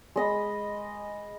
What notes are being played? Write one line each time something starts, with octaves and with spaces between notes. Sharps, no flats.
G#3 D#5 B5